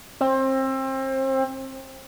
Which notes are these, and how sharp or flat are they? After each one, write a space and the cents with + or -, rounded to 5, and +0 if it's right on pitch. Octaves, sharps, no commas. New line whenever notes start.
C4 +30